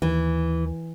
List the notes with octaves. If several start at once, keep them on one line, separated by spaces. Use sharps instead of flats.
D#2 E3